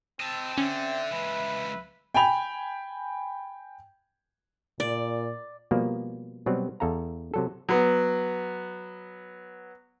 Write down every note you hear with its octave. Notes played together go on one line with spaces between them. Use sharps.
C4 D#5 A5 E6
D3 C#4 E5
C#2 E3 B4
G5 G#5 B5 F7
A#2 D5
B2 F3 G3 A#3
B2 F#3 G3 C4
E2 A4 F5 A#5
C3 F#3 A4
F#3 B3